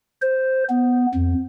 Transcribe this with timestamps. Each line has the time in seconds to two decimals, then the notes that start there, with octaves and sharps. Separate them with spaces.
0.22 C5
0.70 B3
1.14 F2